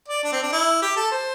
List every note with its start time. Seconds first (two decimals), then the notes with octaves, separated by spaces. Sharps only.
0.08 D5
0.23 D4
0.32 C4
0.43 D4
0.52 E4
0.82 G4
0.96 A4
1.11 C5